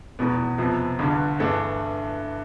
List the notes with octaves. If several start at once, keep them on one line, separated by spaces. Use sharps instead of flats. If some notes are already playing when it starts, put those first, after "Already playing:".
F1 E2 B2 B3
F2 C3 F3 B3
G1 G2 D3
G2 E3 A3 D4